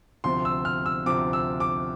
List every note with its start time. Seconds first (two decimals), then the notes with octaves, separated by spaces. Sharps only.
0.24 D2 C3 F3 C6
0.45 E6
0.65 F6
0.86 E6
1.06 D2 C3 F3 D6
1.33 E6
1.60 D6